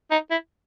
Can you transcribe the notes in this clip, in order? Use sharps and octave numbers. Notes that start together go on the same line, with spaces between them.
D#4
E4